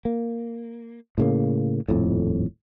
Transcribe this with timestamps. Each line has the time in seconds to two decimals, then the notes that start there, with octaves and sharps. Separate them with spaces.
0.05 A#3
1.18 A2 C#3 A#3
1.88 D#1 F2 A2